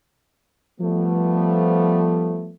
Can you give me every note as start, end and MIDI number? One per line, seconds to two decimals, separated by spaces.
0.80 2.53 53
0.80 2.53 55
0.80 2.53 57
0.80 2.53 59